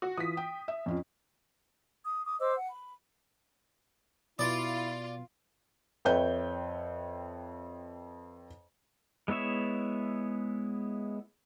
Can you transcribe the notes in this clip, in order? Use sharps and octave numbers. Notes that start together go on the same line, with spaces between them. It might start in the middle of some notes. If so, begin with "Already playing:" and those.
F#4
E3 F4 D#6 B6
G5
E5
F2 C#4 F4
D#6
D6 D#6
C5 D#5 D6 E6
F#5
B5
B2 E4 F4 D5
F2 B4 C#5 E5 G5 G6
G#3 B3 E4 C#5 E5